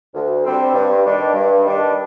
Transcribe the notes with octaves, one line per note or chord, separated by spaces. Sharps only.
D2
D3 G3 C4
G2
D#3 G3 D4
G2
D#3 G3 D4